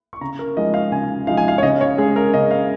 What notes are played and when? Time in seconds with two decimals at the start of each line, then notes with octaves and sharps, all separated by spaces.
0.13 C#6
0.21 C#3 A#5
0.39 A#4
0.57 F3 G#3 D#4 D#5
0.74 F5
0.92 C#3 G#5
1.27 F3 G#3 D#4 F5
1.37 G#5
1.48 F5
1.58 C#5
1.63 C#3 D#5
1.81 C#5
1.98 G#3 C#4 G#4
2.16 A#4
2.34 C#3 D#5
2.51 F5